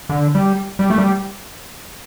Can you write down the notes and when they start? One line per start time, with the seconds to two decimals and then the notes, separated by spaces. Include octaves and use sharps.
0.09 D3
0.35 G3
0.79 G3
0.90 A3
0.98 G3